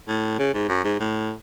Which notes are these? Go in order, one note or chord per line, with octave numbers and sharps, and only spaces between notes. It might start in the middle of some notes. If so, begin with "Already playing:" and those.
A2
C#3
G#2
F#2
G#2
A2